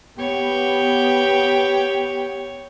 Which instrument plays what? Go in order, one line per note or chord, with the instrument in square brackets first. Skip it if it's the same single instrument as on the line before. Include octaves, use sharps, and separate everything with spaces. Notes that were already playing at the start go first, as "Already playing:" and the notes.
[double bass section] B3 [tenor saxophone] G4 [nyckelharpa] C#5